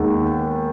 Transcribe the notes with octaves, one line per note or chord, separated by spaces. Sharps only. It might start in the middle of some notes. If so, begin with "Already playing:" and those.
Already playing: D#2 D#3 G#3 B3